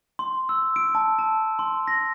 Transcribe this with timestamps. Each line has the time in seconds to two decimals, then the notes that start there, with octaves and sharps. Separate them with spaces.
0.19 C6
0.49 E6
0.76 D7
0.95 A5
1.19 A5
1.59 C6
1.88 A#6